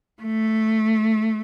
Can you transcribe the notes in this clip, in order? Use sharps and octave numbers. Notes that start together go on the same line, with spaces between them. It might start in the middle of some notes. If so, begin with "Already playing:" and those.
A3